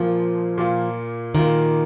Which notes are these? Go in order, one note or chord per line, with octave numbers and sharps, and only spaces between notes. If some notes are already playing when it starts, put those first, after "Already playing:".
Already playing: A#2 F3 A#3 F4
A#2 A#3 F4
A#2 D#3 A#3 F4